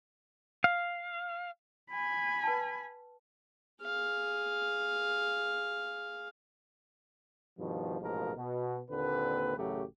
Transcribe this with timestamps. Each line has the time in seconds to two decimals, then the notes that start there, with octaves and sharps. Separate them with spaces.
0.64 F5
1.91 G#5 B5
2.43 B4 G5 A5
3.82 G#4 F5
7.59 G2 B2 D#3 F3
8.01 A1 G#2 B2 F3 A#3 A#4
8.37 B2
8.90 D#2 A#2 D3 C4 B4
9.57 A1 F#2 C#3 F#3 A3 G4